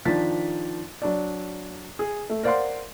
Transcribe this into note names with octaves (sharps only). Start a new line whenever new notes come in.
D#3 F3 D4 A6 B6
F#3 D4 D5
G#4
A3
A#4 C5 D5 F5 F#5 C6